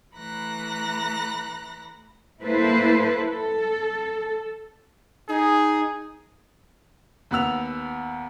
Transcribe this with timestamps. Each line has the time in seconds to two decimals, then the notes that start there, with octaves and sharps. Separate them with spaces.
0.15 E3 A3 A#5 B5 F#6 A#6
2.43 A#3 E4 A4 B4 C5
3.23 A4
5.29 D#4 G#4
7.31 D#2 B3 F#5 E6 F7